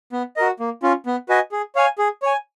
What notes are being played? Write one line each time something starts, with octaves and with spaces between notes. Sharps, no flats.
B3
F#4 A#4 D#5
A#3
C#4 F4
B3
F#4 B4 D#5 G#5
G#4
C#5 F5 G#5
G#4
C#5 G#5